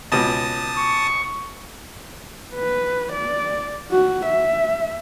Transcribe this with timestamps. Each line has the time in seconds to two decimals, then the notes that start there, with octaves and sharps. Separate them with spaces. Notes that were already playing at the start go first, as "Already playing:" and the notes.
0.12 C#2 B2 A5 D#6
0.78 C#6
2.55 B4
3.12 D5
3.91 F#4
4.26 E5